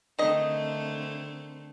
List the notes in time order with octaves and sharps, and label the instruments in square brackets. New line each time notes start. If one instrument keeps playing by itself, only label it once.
[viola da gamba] D3 A3 C4 [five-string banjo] D#3 D#5